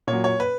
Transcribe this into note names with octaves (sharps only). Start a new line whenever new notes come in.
A#2 C#5
F#3
C#5
B4